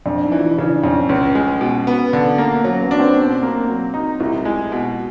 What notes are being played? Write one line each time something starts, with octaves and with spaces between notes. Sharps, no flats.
F2 D4
D#4
E3
E4
C#3 D4
F2 C#4
C#2 C#4
G#3
B2
B3
D3
A#3
F#3 C#4
B3
D4
C4
B2
A#3
F#3
D#4
C2 E4
G#3
B2